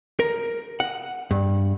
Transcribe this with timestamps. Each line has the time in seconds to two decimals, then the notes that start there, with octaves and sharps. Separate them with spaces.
0.20 A#4
0.80 F#5
1.31 G2